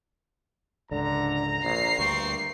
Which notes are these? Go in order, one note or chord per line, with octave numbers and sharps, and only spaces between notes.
C#2 G#2 D3 A#5
A#1 A#3 C7
D2 G2 C4 C#6